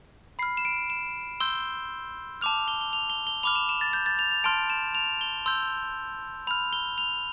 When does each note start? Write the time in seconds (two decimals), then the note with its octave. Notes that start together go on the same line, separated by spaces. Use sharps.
0.39 B5 C7
0.43 F6
0.57 E7
0.65 D7
0.90 E7
1.40 C6 E6 G6 G7
2.41 A5 D6 F6 F7
2.68 G7
2.81 G7
2.93 F7
3.10 G7
3.27 G7
3.43 B5 D6 F6 F7
3.56 E7
3.69 E7
3.81 A6
3.93 G6
4.06 A6
4.19 F7
4.32 F7
4.44 A5 C6 F6 D7
4.70 E7
4.95 F7
5.21 G7
5.46 C6 E6 G6
6.47 B5 F7
6.51 F6
6.73 G7
6.98 F7